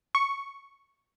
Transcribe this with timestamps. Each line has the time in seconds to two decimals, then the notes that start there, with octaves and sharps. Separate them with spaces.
0.15 C#6